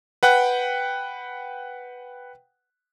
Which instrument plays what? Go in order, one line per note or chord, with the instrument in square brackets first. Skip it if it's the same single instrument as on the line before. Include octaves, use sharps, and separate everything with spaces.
[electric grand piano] B4 F#5 G5 F#6